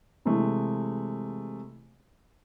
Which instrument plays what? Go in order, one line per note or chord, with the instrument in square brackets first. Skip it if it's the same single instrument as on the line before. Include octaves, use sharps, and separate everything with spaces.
[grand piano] C3 E3 G#3 A3